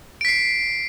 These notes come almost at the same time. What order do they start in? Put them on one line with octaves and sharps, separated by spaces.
D7 B6 C7